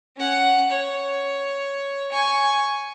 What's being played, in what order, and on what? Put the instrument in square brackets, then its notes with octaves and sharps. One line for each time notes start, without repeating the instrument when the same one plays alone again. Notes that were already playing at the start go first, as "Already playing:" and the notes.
[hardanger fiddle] C#4 F#5
C#5
G#5 C#6